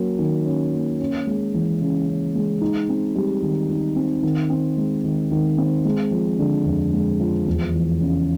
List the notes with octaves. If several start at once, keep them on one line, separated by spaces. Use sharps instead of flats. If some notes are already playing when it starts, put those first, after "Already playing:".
Already playing: F#3 A#3 C#4
D#3
C#4
A#3
C#4
G#3
E3
C#3
C#4
G#3
D#4
C4
G3
D#3
D#4
C4
D#3
C4
G#3
D#3
D#3
C4
G#3
F3
D3
F2
G#3
F3
E2
E3
C#3